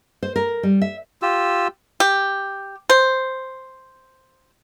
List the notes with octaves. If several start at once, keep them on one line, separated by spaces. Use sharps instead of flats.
C5
A#4
G3
E5
F4 G4 E6
G4
C5